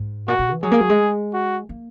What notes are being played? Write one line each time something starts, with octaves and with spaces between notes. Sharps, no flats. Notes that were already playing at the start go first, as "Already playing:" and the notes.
Already playing: G#2
A#2 F#4
A#2
E3
F#3 G#4
A#3
F#3
G#3
F#4
A#3